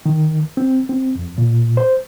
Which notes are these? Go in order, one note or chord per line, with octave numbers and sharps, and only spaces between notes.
D#3
C4
C4
F2
A#2
C5